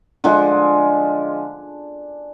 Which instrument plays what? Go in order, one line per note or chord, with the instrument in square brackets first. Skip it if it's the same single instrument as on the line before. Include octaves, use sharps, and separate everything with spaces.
[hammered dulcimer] D3 F3 G#3